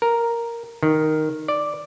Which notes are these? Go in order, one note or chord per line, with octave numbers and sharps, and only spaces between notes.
A#4
D#3
D5